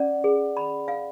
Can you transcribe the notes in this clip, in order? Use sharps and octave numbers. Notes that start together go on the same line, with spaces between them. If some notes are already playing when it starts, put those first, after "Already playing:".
Already playing: C#4 D5 F#5
G#4
B5
F5